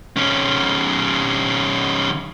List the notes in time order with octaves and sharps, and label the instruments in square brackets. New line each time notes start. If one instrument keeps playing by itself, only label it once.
[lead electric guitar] D#3 C#4